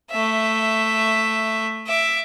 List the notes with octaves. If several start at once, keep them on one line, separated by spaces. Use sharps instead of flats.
A3 E5
E5 D6